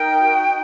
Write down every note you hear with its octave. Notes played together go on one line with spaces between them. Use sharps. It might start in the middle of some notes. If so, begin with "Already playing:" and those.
Already playing: D#4 A#4 G5
F#4
D#4